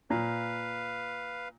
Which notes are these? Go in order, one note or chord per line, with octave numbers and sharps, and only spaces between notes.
A#2 B4 F5